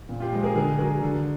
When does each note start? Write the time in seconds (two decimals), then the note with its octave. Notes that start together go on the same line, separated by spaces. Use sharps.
0.09 A#2
0.20 F4 G4
0.32 F3 G#3
0.43 G#4 A#4
0.55 D3 G#4 A#4
0.78 F#3 G#4 A#4
1.02 D3